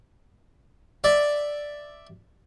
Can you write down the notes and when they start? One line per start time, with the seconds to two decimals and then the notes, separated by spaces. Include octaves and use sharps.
1.04 D5 E5